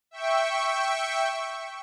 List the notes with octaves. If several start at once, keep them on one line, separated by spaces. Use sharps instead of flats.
E5 G5 C#6